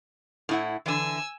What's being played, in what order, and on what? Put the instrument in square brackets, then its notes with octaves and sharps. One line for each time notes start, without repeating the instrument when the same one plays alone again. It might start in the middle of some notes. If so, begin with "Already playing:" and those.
[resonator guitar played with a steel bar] A2 E4 F#5
[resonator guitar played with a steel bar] D3 E3 [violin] G#5 E6